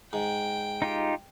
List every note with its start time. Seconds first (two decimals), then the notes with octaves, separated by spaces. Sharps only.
0.13 G#2 G5
0.82 D#4 F4 G4